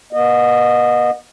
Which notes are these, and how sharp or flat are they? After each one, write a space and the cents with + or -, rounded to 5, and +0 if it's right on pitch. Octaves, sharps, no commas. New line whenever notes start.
B3 -40 D#5 -20